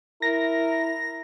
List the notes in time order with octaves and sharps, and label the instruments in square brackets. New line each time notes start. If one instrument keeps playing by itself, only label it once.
[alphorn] E4 [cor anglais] A#4 [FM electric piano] A#6